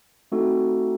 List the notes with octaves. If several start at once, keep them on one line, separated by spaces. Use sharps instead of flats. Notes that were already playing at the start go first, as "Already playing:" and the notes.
A3 C4 D#4 F#4 A4